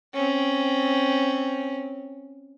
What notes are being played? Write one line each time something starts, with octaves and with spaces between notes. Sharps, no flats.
C4 C#4